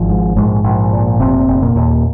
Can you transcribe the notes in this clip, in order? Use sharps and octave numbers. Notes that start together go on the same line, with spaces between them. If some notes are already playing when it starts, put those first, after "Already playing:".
Already playing: G#1 F3
G#2
A#1 G#2 G#3
A#1
A#2
F1 C3 C4
F1
A#2 A#3
D#2